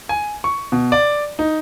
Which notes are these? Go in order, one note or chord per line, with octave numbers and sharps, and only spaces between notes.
G#5
C#6
B2
D5
D#4